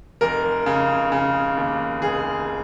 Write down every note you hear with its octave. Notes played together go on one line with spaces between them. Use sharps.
F1 A#4
C#3
C#3
D#2
F1 G#4